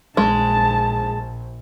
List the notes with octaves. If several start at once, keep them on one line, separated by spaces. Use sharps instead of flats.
A#1 G#3 A5